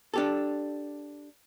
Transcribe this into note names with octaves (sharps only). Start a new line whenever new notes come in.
D4 G4 A4